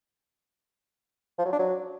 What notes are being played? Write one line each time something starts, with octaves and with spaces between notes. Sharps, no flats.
F3
F#3
D4
F#3